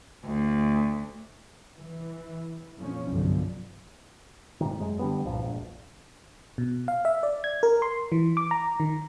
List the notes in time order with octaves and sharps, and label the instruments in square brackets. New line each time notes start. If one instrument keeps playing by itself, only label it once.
[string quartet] D2
[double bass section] E3
F2 A#2 F3 C#4
G1 C2 F#2 D3 F3
[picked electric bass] G#2 C3 D#3
F#2 G#3
D3 G3 B3
C2 G2 A#2 F3
E1 A#1
[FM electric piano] B2
F5
E5
D5
G#6
A#4
C6
E3
D6
A#5
D#3